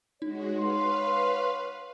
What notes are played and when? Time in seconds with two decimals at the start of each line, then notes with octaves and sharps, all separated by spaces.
0.22 G#3 D#4 F#4 C#5
0.56 F#4 B4 F5 C6